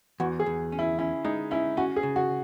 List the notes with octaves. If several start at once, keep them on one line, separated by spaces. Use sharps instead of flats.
E2 F#4
G#4
E2
C#4
E4
C#4 E4
G#3 D#4
C#4 E4
C#4 F#4
G#4
C#3
F#4